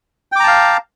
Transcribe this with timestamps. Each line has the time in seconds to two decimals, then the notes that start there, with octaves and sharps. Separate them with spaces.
0.32 G5
0.36 D6
0.40 A#5
0.44 A5
0.47 F5